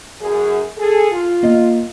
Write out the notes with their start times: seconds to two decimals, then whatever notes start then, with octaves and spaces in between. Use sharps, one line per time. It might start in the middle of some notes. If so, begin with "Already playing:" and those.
0.21 F#2 G#4
0.77 G#4 A4
1.11 F4
1.43 A#3 D#5